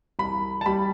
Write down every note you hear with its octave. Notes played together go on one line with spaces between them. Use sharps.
C2 B5
A5
G3 B5